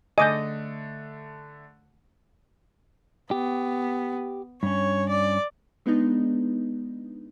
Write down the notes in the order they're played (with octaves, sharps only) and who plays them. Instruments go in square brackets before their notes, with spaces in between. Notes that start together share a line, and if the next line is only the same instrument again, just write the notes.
[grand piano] D3 A3 [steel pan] D#5 [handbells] G#5 D6 G6
[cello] B3 [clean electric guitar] G4
[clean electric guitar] G2 C#4 [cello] C#5
[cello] D5
[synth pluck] G#3 B3 D4 D#4